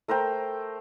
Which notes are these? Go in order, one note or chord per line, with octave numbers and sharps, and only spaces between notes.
A3 A#4 C5 G5